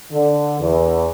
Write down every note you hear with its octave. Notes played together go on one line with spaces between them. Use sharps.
D3
E2